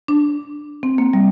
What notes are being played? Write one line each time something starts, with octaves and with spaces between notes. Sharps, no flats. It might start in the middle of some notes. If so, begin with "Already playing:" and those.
D4
C4
A#3
G3